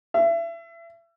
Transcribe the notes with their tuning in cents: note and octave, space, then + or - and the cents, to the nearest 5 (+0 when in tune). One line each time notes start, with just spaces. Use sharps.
E5 +30